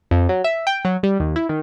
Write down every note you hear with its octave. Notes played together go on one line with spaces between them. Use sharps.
F2
F#3
E5
G5
F#3
G3
D#2
E4
D#3